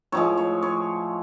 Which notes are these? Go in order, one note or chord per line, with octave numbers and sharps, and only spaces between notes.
A2 F3 G#3 C#5
C#5
C#5